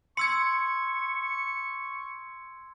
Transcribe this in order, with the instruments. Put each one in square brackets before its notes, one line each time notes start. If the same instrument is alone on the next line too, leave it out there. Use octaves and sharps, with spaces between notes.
[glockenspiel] C6 E6 G#6 [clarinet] C#6 [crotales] C#7